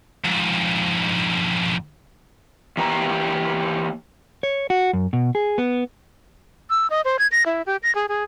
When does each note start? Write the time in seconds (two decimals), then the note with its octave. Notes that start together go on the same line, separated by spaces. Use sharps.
0.24 F2 G#2
2.77 E3 A#3 G4 G#5 A#5
4.43 C#5
4.70 F#4
4.93 F#2
5.13 B2
5.35 G#4
5.58 B3
6.70 E6
6.90 D#5
7.05 C5
7.19 G#6
7.32 A#6
7.46 E4
7.66 G4
7.83 A#6
7.95 G#4
8.09 G#4